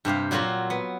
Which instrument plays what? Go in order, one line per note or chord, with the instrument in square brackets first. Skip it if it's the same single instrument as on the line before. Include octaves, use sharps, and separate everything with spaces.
[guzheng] G2 C3 G4 F5
A#2 F#3 A#3 F4 F#4 A#4
B3